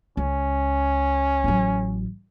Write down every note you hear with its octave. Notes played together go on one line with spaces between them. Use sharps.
C#2 C#4
A1 F#3